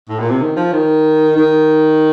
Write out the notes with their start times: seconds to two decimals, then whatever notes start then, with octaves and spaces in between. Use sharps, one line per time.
0.09 A2
0.19 A#2
0.30 C3
0.41 D#3
0.56 F3
0.72 D#3
1.36 D#3